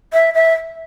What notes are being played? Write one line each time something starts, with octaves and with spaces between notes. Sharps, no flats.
E5
E5